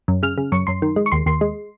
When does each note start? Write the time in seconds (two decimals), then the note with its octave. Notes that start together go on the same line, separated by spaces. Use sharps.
0.08 F#2
0.23 C#3 F6
0.38 C#3
0.52 F#2 C#6
0.67 F#2 C6
0.82 D#3
0.96 G#3
1.06 C#6
1.12 D#2 C6
1.26 D#2 C6
1.41 G#3